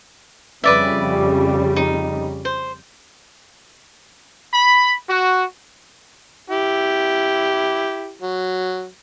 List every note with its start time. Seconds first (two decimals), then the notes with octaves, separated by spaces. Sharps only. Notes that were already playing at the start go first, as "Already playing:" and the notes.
0.64 F2 C#3 G3 B4 D5 E5
1.76 D#4
2.45 C5
4.54 B5
5.08 F#4
6.50 E4 G4
8.21 F#3